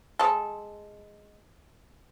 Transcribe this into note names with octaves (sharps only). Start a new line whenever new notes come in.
G#3 A4